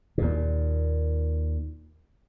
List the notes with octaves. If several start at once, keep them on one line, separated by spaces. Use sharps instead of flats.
D#2 A#2